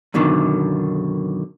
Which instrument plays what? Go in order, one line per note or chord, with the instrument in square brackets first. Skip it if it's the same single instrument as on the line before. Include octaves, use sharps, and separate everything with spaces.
[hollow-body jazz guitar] F#2 B2 D3 D#3